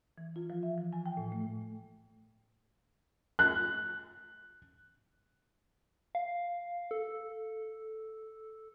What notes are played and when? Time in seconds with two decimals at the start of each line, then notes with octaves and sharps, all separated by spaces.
0.18 E3
0.36 F4
0.50 F3
0.63 E5
0.78 E3
0.93 G#5
1.06 G5
1.17 A2
1.32 A3
3.39 F#6
6.15 F5
6.91 A4